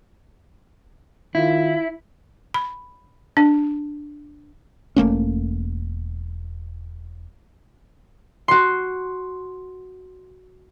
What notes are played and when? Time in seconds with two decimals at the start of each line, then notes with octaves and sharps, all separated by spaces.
1.35 D#3 E4 F4
2.54 B5
3.37 D4
4.96 E1 A3 A#3 C#4
8.48 F#4 C6